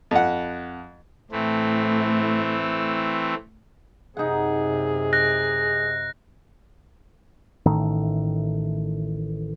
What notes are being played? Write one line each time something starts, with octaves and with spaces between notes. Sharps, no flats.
F2 F#5
A2 E3 A3 C4
F#2 C3 D#4 G#4 F#5
F#6 A#6
A1 A2 D#3 A3